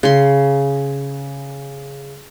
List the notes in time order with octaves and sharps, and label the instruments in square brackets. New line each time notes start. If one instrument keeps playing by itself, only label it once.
[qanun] C#3 C6